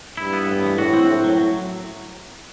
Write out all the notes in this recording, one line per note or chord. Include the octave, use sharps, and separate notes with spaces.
G2 E4
B3
A2
E3
A2 F#4
C4
F#2 A2
F#3